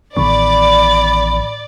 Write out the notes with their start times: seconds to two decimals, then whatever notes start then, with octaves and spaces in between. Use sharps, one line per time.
0.17 A1 A2 D#3 B3 D5 B5